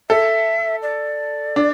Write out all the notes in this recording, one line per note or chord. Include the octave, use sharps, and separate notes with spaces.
A4 E5
D5
D4